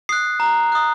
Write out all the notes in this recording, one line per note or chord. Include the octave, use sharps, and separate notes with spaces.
D#6 F#6 C7
A#5
D#6 F#6